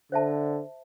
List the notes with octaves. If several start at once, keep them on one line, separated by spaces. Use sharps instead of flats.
D3 C5 E5 A5